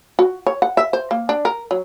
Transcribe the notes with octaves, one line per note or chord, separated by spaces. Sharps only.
F#4
C#5
F#5
E5
C5
A#3
D4
A#4
F#3